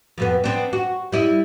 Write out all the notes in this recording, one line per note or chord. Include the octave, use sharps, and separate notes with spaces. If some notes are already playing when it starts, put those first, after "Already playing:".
F2 B2 B3
B3 C4 D4
F#4
G3 E4 D#5